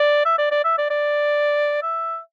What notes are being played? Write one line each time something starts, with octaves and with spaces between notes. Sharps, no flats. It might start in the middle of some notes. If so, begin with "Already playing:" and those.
Already playing: D5
E5
D5
D5
E5
D5
D5
E5